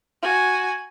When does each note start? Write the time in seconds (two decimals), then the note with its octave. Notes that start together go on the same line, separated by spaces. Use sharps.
0.22 F#4 G#5